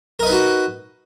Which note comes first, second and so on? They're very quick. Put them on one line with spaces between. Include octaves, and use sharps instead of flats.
A#4 D#5 B4 D#4 F#4